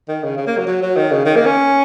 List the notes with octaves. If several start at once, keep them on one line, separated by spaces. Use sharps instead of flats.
D#3
C#3
C#3
A#3
F#3
F#3
F#3
D#3
C#3
D#3
A#3
C#4